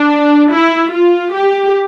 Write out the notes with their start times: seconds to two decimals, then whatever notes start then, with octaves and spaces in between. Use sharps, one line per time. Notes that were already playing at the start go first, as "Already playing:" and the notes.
Already playing: D4
0.49 E4
0.91 F4
1.33 G4